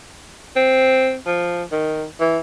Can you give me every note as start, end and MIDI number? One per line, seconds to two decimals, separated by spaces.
0.56 1.17 60
1.26 1.63 53
1.72 2.04 51
2.20 2.39 52